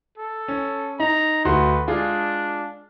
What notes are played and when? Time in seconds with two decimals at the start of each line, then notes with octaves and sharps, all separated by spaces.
0.18 A4
0.48 C#4
1.00 D#4 A#5
1.45 D2 F#4 B4 C6
1.87 G#3 D4 F4 G#4